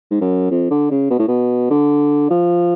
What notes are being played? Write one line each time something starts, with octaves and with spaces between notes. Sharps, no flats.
G#2
F#2
F2
D3
C#3
B2
A2
B2
D3
F3